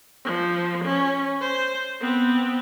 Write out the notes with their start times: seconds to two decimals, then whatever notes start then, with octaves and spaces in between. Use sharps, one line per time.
0.25 F3
0.84 C#4
1.41 C5
2.01 B3 C4